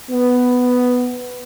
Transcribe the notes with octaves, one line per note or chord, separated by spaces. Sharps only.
B3